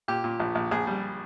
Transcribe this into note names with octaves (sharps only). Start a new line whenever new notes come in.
A#2 G4
A#2
A#1
A#1
A#1 G#4
G3